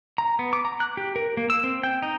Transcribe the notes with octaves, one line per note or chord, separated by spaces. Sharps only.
A#5
B3
D6
A#5
F#6
G4
A#4
A#3
E6
C4
G5
D#4